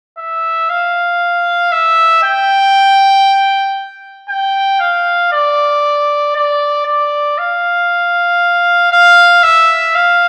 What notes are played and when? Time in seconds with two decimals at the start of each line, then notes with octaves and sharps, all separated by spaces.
0.18 E5
0.69 F5
1.72 E5
2.23 G5
4.29 G5
4.80 F5
5.32 D5
6.35 D5
6.86 D5
7.38 F5
8.92 F5
9.43 E5
9.95 F5